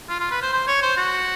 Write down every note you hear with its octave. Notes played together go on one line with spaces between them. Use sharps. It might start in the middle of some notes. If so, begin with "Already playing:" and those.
F4
F4
B4
C5
C5
C#5
C5
F#4